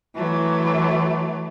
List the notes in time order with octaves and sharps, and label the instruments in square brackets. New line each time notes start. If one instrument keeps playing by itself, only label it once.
[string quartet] E3 F#3 A3